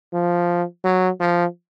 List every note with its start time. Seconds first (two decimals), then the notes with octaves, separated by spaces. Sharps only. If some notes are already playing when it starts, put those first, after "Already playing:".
0.13 F3
0.84 F#3
1.20 F3